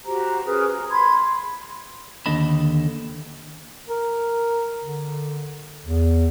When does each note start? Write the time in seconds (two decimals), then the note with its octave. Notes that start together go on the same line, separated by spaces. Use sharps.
0.05 F#4 G4 C5 A#5
0.45 C#4 G#4 A#4 B4
0.68 A#5
0.91 B5 C6 G#6
2.26 D#2 D3 D#5 A5 B5
3.88 A#4
4.83 D3
5.86 E2